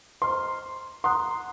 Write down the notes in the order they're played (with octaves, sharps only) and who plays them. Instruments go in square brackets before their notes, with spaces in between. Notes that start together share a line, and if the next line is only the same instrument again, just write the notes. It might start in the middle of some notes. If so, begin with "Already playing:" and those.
[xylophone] C5 D#5 A#5 F6 [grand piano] C6
[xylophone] F#5 A#5 D#6 F#6 [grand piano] C6